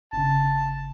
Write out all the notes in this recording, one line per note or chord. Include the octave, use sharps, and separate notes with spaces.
G1 C#3 A5